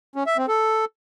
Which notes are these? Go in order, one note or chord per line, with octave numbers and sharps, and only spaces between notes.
C#4
E5
C4
A4